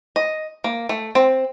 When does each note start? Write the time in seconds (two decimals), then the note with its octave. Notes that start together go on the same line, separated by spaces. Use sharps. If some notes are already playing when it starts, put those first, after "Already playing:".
0.16 D#5
0.64 A#3
0.89 A3
1.15 C4